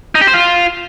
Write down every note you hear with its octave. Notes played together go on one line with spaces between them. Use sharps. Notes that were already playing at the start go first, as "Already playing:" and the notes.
D#4
G4
C5
F4